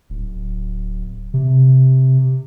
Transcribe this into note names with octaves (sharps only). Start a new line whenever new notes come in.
D1
C3